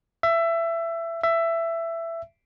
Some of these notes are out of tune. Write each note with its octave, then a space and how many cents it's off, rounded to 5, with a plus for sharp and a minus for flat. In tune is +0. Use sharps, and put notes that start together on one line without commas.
E5 +20
E5 +15